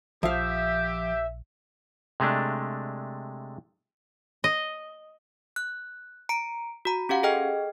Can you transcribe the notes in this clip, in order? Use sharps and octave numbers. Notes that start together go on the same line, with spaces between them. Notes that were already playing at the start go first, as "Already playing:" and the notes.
A#1 F3 G4 E5 F5
C3 G#3 A3 D4
D#5
F#6
A#5 C#7 D7
F#4 A#5
C#4 G4 F5 F#5
G#4 A4 D#5 G5 F6